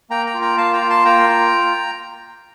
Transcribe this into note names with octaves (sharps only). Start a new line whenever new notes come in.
A#3 G5 A#5
G5 A#5
F4
G5 A#5
A#3 F5 A5
G5 A#5
F4
A5 C6
A#3 G5 A#5
F4